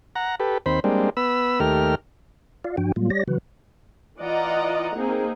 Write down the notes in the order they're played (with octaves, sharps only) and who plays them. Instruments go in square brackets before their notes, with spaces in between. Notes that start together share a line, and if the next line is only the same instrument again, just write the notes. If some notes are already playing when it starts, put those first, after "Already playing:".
[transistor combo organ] F#5 A#5
G4 A4 B4
D#2 C4 C5 B5
G3 G#3 A#3 C4 D4
B3 B5 E6
D#2 A3 G4 A#4 F6
[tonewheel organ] F4 D5 F5
G2 F3 D4 F#4 G5
A2 F#3 G3 A#3 F4
G3 G4 C#5 D5 A#6
C#3 E3 F#3 F#4 B4
[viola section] E3 F4 D5 D#5 F#5 A#5
A#3 C4 D#4 G#4